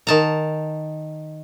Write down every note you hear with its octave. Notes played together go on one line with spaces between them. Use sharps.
D#3 A5 A#5